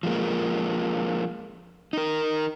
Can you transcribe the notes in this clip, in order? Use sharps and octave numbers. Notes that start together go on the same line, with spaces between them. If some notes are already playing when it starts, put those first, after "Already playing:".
F3 G#3 A#3
D#4 A#4